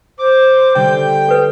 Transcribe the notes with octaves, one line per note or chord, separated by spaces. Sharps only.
C5 D6
D3 G3 G5
A4 B4